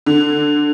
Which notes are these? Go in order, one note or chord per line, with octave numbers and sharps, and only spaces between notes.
D3